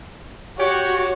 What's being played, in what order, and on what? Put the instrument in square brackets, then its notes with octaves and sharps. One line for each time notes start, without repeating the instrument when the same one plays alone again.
[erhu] F#4 [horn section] G4 C#5